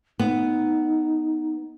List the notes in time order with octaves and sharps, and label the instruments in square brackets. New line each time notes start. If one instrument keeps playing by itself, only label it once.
[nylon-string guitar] B3 [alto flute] D#4